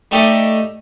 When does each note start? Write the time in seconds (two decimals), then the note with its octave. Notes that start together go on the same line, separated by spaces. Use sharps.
0.11 A3 D#4 G4 A4 D5 D#5